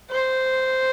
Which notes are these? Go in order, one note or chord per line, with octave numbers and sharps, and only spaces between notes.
C5